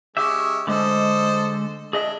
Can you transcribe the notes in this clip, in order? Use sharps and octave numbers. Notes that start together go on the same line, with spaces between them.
G#3 C#4 G4 E5
D3 G#3 A4 C5 D#5
D4 G#4 D#5 E5